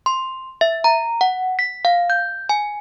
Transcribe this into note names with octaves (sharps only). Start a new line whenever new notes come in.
C6
E5
A#5
F#5
B6
F5
G6
G#5